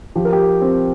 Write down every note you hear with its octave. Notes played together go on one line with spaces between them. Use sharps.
F3 G4
A#4
G4
C4